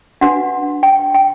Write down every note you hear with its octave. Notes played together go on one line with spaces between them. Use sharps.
D4 F#4 B4 F#5
G5
G5